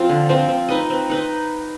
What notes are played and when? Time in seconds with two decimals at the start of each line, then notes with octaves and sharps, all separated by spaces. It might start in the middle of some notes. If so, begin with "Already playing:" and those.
Already playing: F3 C4 F4
0.09 D3
0.29 F3 C4 F4
0.49 C4
0.69 D#4 B4 D#5
0.90 C4
1.10 D#4 B4 D#5